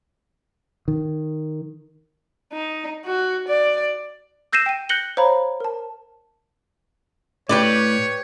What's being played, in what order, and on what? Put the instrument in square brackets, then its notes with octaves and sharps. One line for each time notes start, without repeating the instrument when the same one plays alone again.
[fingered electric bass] D#3
[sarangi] D#4
F#4
D5
[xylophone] E6 G6 A#6 C7 D#7 E7
G5 D#7
F#6 G6 A#6 C#7 F#7 G7
C5 C#5 F5 A#5 B5
A#4 A5
[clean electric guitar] A2 [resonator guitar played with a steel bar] G4 B4 D5 [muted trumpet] C#5